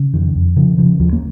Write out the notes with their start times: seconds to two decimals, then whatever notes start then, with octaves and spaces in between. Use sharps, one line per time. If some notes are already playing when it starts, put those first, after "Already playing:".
Already playing: C#3
0.14 F2 D#3
0.35 F2
0.56 C#3 F3
0.78 C#3 F3
0.99 D#2 F3
1.13 A#3